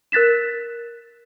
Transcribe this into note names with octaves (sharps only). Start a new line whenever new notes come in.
A#4 F#6 A6 B6 E7